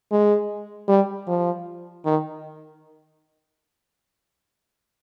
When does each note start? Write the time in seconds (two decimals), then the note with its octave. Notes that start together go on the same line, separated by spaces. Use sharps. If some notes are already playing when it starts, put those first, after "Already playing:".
0.11 G#3
0.88 G3
1.27 F3
2.05 D#3